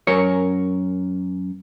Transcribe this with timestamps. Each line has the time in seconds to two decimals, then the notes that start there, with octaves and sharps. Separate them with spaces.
0.07 F#2 A#4 C#5